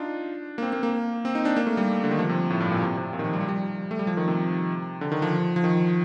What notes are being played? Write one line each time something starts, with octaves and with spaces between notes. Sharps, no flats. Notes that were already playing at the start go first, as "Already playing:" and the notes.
Already playing: D4 D#4 F4
A#3
C4
A#3
A#3
C4
D#4
D4
A#3
A3
G3
D3
D#3
F3
C3
A2
G2
A#2
C3
C3
A#2
D#3
F3
G3
F3
G3
A3
G3
F3
D#3
C3
D3
D#3
F3
F3
D#3